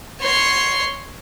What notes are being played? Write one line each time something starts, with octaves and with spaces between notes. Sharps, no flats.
C#5 C6